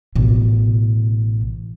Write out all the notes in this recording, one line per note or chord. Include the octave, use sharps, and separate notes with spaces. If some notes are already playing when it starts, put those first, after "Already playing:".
A1 B2